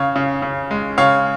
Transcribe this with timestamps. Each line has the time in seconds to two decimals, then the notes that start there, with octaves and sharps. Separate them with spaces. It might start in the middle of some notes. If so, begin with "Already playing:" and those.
Already playing: C#3 C#5 F5
0.16 C#3
0.42 C#3
0.71 G#3
0.98 C#3 C#5 F5